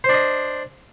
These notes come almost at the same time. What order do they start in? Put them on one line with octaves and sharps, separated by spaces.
C5 D4 D#5